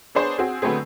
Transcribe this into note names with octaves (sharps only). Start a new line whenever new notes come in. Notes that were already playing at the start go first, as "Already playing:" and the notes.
B3 D4 G#4 C5 C#5
C4 F#4 G#4
D3 F#3 A3 B3 C4 G#4